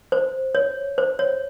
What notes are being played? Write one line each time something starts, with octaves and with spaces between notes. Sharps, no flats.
C5
C#5
C5
C#5